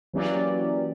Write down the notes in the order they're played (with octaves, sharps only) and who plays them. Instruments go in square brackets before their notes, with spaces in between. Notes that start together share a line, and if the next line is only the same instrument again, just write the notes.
[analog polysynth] E3 F#3 A#3 C#4 G4 D5